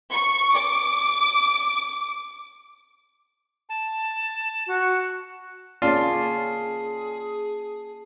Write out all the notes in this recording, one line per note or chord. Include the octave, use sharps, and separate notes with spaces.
C#6
D6
A5
F#4
A#3 C#4 F4 G#4 D5 A5 C7